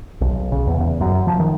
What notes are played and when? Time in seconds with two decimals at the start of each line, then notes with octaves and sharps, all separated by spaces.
0.21 B1
0.52 C#3
0.67 E2
0.80 E2
1.00 F#2
1.27 F3
1.40 D#3